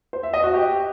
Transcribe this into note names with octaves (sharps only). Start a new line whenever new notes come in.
C5
E5
D#5
F#4
G4